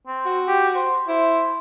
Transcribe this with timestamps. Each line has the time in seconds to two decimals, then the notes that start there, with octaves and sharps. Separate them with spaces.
0.07 C4
0.26 F#4
0.48 G4
0.75 C5
1.08 E4 C5